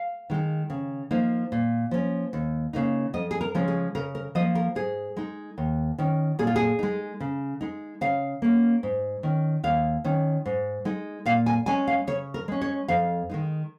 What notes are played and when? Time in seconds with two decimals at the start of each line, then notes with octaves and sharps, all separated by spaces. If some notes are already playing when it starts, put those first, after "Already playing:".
Already playing: F5
0.30 D#3 G#3 D#4
0.70 C#3
1.11 F3 A#3 D#4
1.52 A#2
1.91 F3 C#4
2.33 D#2
2.73 C#3 A#3 D#4
3.14 F2 D#5
3.31 G#4
3.41 A#4
3.55 C#3 F3 G#3 C#4
3.68 G#4
3.95 C#3 A#4
4.15 A#4
4.35 F3 D#5
4.40 A#3
4.55 A#4
4.75 G#2 G#4
5.17 G#3 D#4
5.58 D#2
5.98 D#3 C#4
6.39 A#2 G#4
6.47 F4
6.56 G#4
6.79 G#3 D#4
7.20 C#3
7.61 G#3 D#4
8.01 C#3 F5
8.42 A#3 C#4
8.83 G#2
9.23 D#3 C#4
9.64 D#2 F5
10.04 D#3 C#4
10.45 G#2
10.85 G#3 D#4
11.26 A#2 F5
11.46 G#5
11.66 G#3 C#4 G#5
11.87 F5
12.07 C#3 C#5
12.34 A#4
12.48 G#3 C#4
12.62 C#5
12.88 F2 F5
13.30 D#3 G#3 D#4